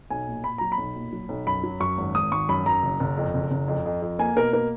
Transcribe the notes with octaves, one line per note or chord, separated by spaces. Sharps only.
B1 G#5
A#2
A#2 B5
F#3 A#5
B5
B1
A#2
F#3
B1
F#2 B5
F#3
F#2 C#6
G#1
G#1 D#6
G#1 C#6
F#2 B5
F#2 A#5
F#1
F#1
F2
F#1
F#1
F2
F2
F2
A#3 G#5
B2 A#4
A#3 A#4